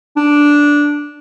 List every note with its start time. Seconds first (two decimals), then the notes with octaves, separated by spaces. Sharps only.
0.16 D4